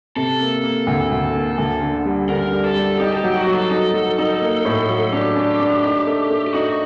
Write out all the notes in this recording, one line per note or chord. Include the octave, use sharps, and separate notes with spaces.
C3 A4
A#3
A#3
D2
D2
A#3
D2
D3
G3
D3 A#4
G3
A4
G3
D#4 G4
A4
G4
F#3
F#4
F#3
A4
D#4 A4
F#3
D#4
A#3
A2
F#3
D4 G4
D4
D4
D#4
A3
A3
G4
D#4 F#4